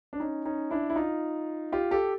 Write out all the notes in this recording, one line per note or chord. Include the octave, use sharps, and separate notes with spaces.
D4
C#4 D#4
C#4 D#4
D4 E4
E4
D#4 F4
F4 G4
G4 A4